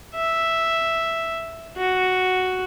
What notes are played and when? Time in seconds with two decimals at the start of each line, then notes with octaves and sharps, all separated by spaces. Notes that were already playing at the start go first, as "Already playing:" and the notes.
0.14 E5
1.77 F#4